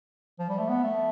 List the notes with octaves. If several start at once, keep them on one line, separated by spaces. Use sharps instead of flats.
F3
G3
A3
B3
A3